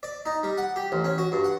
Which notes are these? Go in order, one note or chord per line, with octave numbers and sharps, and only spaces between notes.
D5
D#4
G3
F#5
G4
A1
C#4
F#4
G2
F#5